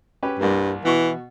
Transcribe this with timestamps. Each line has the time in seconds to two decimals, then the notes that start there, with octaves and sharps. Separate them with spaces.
0.23 C#4 G4 B4
0.39 C2 G2 A#3
0.85 B2 E3 C#6